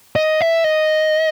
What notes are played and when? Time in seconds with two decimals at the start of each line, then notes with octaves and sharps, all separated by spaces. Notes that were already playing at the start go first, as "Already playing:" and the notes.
0.16 D#5
0.41 E5
0.64 D#5